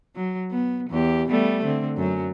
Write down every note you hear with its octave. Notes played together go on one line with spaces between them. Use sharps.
F#3
B3
E2 G4
G3 A3 B3
D3 C4
F#2 F#3